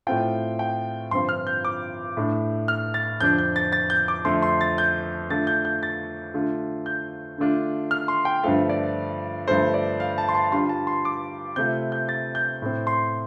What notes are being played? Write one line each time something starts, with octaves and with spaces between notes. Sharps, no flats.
A2 A3 C4 F4 G5
G5
G2 D3 F3 C4 F4 C6
F6
G6
D6
A2 A3 D4
F6
A6
F2 D3 F3 D4 G6
G6
A6
A6
G6
D6
F2 D3 A3 C6
C6
A6
G6
D3 A3 D4 F4 A6
G6
G6
A6
D3 A3 D4 F4
G6
D3 A3 D4 F4
F6
C6
G5
G2 D3 F3 A3 F4 F5
D5
G2 D3 F3 A3 C5
D5
F5
A5
C6
A5
D3 G3 D4 F4 C6
A5
C6
D6
C3 A3 F4 G6
G6
A6
G6
A2 A3 C4
C6